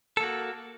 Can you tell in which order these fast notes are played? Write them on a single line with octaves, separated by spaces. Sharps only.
A4 A#3 F#4